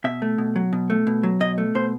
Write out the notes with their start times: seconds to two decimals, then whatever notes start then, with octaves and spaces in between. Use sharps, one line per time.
0.04 B2 E5
0.22 A3
0.38 B2
0.56 F#3
0.73 B2
0.90 A3
1.07 B2
1.23 F#3
1.40 B2 D#5
1.58 A3
1.75 B2 C5